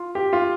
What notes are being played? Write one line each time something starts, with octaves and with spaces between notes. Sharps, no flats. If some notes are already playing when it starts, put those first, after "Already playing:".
Already playing: F4
G4
F4